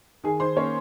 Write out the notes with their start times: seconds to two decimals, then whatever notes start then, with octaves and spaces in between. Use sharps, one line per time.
0.24 D#3 G#4 G#5
0.40 D#3 C5 C6
0.56 A#3 C#4 C#5